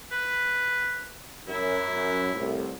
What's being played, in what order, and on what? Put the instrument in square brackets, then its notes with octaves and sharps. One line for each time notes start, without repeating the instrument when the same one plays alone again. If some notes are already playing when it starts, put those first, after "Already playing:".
[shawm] B4
[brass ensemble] F#2 [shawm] E4
[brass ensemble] C2 A2